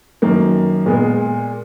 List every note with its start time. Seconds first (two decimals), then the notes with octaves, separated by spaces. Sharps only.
0.22 F#2 D#3 A#3
0.86 A#2 G#3 B3